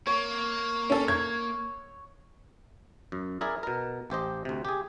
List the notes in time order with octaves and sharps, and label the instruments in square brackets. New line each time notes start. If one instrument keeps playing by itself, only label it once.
[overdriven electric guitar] A#3 [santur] C#5
[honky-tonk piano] C#4 A4
[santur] C#5 [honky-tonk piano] G#6
[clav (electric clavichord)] F#2
E4 G#4 A#4 D5 E5
B2 A#4
A1 G4 C5 D#5
D2 C3
G4 G#4